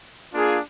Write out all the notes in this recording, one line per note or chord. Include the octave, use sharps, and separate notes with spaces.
A#3 D4 F4 G#4